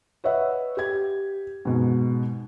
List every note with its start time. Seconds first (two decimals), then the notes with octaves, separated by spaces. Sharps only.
0.24 B4 C#5 D#5 E5 F#5
0.77 G4 G#6
1.65 G#2 B2